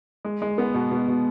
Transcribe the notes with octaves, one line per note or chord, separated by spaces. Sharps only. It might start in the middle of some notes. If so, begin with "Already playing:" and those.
G#3
G#3
B3
B2
B2
B2